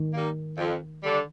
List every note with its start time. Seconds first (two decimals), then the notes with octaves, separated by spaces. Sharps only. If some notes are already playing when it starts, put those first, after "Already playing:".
Already playing: D#3
0.12 G3 A#3 D#4
0.57 F2
1.02 D3 G3 D4